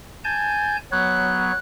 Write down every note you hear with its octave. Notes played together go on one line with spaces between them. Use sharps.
G#5 A5 G6
F#3 B3 C#5 F#6